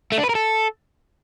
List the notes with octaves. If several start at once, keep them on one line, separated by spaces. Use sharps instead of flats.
A3
D4
B4
A#4
A4